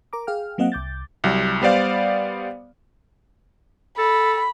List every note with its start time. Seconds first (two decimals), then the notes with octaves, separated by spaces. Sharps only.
0.13 A#4 A#5 D6
0.27 G#4 F5 G5 F6
0.58 F#3 A#3 C4 D#5 F5 F#5
0.72 C2 D6 G6 A6
1.24 C2 F#3 G3
1.62 G3 B3 C5 D5 F5
3.98 A4 B5